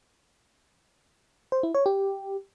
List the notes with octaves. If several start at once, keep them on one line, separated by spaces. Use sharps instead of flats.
C5
E4
C#5
G4